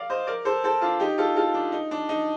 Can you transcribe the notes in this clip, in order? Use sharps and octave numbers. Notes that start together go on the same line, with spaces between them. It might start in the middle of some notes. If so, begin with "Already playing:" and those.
Already playing: A#4 D5 F5
C5 D#5
A#4 D5
A4 C5
A4 C5
D4 F4
D#4 G4
F4 A4
F4 A4
D4
D#4
D4
D#4